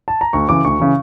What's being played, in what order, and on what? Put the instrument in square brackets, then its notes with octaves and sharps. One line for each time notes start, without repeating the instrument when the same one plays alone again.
[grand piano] A5
A#5
D2 C#6
C#3 E3 D6
D2 C#6
C#3 E3